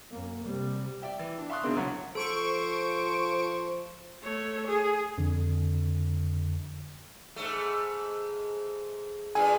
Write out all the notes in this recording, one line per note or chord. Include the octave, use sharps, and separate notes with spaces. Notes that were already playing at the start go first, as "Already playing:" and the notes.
F#2 A#3
C3 G3
D5 E5 G5
E3
D4
E5 F5 C6 C#6 D#6 F#6
B2 D3 D#3 G#3 C4 D4
C2 C#3 F#3 C#5 F#5
F3 A4 C5 C#6 D7
A3 C#5
G#4
F2 D3
G#2 A3
G2 A#2 G#4 G#5